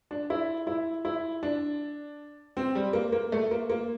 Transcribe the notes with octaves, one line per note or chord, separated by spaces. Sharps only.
D4
E4
E4
E4
D4
C4
G3
A#3
A#3
A3
A#3
A#3